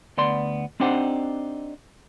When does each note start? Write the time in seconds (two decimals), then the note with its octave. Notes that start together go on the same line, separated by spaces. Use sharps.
0.18 D2 B3 D5 C6
0.80 C4 D4 D#4 G4 C5 F#5